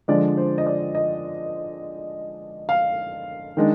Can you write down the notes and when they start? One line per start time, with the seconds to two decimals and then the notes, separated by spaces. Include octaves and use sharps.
0.08 D3 F3 G#3 D5
0.37 C5
0.58 D#5
0.66 D5
0.95 D#5
2.69 F5
3.57 D#3 G#3 D4